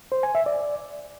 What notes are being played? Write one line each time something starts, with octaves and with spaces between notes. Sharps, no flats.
C5
G#5
E5
D5